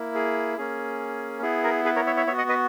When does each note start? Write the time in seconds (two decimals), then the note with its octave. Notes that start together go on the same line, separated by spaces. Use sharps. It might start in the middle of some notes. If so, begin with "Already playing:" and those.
Already playing: A#3 E4
0.15 G#4
0.57 A#3 C#4 G#4
1.42 B3 E4 G#4
1.64 A#4
1.85 G#4 B4
1.96 A#4 C#5
2.07 C#5 E5
2.17 C#5 E5
2.27 B3 C#5 E5
2.32 F#4
2.38 D#5 F#5
2.49 B4 D#5